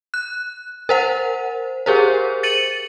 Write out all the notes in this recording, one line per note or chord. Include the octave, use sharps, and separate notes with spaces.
F#6
A#4 C5 F#5
G4 G#4 A#4 C5
A6 C#7 D#7 F#7